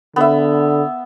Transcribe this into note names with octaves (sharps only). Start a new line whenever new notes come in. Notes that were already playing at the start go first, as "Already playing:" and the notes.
D3 B3 E5